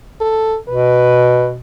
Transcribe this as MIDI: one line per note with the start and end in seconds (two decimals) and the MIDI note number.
0.21 0.57 69
0.69 1.59 47
0.69 1.49 71